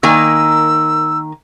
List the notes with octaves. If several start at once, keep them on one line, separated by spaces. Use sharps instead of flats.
D#3 A#3 G#5 E6